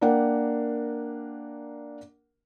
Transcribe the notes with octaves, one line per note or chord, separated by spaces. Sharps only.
A#3 D4 A#4 F#5 G5